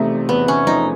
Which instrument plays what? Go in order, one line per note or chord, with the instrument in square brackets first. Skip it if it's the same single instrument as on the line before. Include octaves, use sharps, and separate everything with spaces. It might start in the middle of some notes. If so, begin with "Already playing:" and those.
Already playing: [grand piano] E2 C3 F3 A3 [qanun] D#4
[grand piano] E2 [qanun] B3
[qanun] C#4
[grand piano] F3 [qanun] D#4